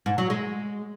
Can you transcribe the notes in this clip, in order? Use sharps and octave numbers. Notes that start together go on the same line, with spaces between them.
G#2
F#3
G#3